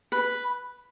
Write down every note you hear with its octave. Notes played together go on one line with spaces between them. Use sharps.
B4